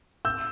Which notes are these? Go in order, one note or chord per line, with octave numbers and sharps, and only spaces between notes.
E6 G6